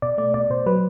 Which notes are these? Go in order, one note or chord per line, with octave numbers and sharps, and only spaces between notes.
B2 D5
A3 D5
B2 D5
B2 C5
F#3 B4